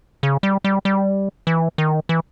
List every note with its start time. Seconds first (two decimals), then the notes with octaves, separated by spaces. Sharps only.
0.23 C#3
0.43 G3
0.64 G3
0.85 G3
1.47 E3
1.78 D#3
2.09 E3